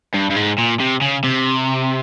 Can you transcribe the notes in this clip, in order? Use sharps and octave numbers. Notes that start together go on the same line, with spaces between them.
G2
G2
G#2
A#2
C3
C#3
C3